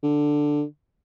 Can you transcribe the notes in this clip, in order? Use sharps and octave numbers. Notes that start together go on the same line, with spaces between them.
D3